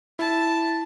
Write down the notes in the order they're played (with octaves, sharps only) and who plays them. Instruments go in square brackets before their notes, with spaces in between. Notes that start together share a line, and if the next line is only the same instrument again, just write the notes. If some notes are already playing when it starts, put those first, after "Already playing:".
[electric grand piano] E4 [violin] A5